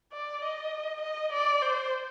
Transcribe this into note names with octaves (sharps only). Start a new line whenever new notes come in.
D5
D#5
D#5
D5
C5